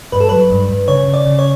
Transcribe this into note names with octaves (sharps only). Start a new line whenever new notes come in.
G2 B4
A4
F#3 B4
G2
G2
C#3 C#5
C#3
D5
C#3
C#5